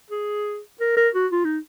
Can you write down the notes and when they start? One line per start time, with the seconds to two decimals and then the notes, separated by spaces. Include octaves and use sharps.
0.10 G#4
0.80 A#4
0.97 A#4
1.14 F#4
1.32 F4
1.45 D#4